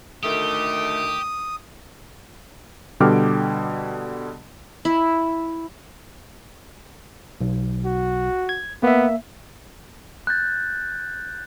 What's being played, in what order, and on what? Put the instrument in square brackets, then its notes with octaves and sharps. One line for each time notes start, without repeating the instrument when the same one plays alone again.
[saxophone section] D2 D#3 A3 [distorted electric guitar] G4 [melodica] D#6
[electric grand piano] B2 D3 G3 G5 D6 F6
[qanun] E4
[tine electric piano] B1
[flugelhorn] F#4
[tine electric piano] G#6
[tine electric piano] A#3 E5 [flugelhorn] B3
[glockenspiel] F#6 G6 A6